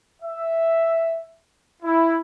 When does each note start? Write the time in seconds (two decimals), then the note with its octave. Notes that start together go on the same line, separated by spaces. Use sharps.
0.22 E5
1.83 E4